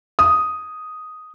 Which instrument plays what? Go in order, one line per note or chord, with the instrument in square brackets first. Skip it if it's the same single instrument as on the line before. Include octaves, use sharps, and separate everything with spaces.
[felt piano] D#6